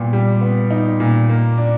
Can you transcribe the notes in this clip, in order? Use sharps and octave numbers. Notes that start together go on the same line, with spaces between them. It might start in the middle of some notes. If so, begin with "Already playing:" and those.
Already playing: A#2 G3 B3
G3
B3
D#4
A#2
A#3
D4